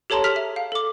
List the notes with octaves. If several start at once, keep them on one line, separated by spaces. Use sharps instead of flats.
G4 A4 C#5 A5 A#5 C6
G#4 F6 B6 F7
E5
F5
A4 D6